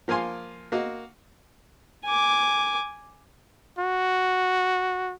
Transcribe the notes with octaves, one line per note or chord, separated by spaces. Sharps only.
F3 A#3 F4 G#5 C6
A#3 F#4 D#5
G#5 D6
F#4